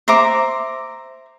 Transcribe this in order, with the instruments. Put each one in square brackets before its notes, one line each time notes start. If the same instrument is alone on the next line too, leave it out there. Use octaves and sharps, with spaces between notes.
[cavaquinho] C5 E5 A#5 D6